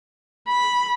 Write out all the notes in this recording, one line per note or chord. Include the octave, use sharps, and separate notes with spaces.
B5